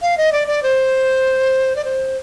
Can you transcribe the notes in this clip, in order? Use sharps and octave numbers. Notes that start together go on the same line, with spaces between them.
F5
D#5
D5
D5
C5
D5
C5